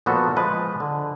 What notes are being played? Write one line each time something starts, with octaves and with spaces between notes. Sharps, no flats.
A#2 F3 B3 F#4 A4
F3 G#3 B4
D3